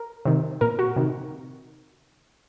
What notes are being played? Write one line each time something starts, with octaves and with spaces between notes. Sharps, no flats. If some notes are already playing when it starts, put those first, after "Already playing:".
Already playing: A#4
C3 D#3
A#2 A#4
F#4
C3 D#3